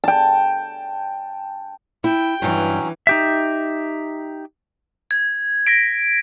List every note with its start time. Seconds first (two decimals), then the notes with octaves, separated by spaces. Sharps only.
0.04 G5 A5
2.04 E4 G5
2.42 G2 E3 F#3 C#4
3.07 D#4 G4 E5
5.11 G#6
5.67 A#6 B6 D7